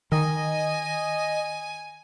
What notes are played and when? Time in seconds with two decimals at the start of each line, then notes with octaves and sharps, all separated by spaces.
0.12 D#3 D#5 G#5